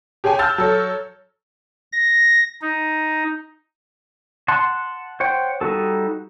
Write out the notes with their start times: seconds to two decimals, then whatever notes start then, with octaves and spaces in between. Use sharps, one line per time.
0.24 G4 G#4 C#5 G5 G#5
0.39 A5 E6 F6 G6 A6
0.58 F#3 A4 C#5
1.92 A#6
2.62 D#4
4.48 F#5 A5 C6
5.20 C5 C#5 F#5 G5
5.61 G3 D#4 F#4 A4